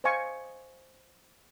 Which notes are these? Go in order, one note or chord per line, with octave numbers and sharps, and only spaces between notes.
C5 D#5 F5 G#5 C#6